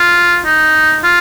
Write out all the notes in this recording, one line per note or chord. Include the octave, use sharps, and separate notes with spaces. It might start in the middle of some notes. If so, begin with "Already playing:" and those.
Already playing: F4
D#4
F4